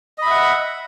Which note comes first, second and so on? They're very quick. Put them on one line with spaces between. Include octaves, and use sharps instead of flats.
D#5 B5 E5 F#5